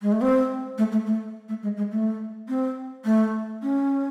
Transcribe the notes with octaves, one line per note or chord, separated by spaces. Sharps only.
G#3
A3
C4
A3
A3
A3
A3
G#3
G#3
A3
C4
A3
C#4